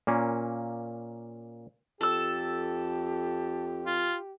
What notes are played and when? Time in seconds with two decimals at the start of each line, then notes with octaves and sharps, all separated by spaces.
0.07 A#2 A#3 C#4
2.01 F2 G4 A4 E6
3.86 F4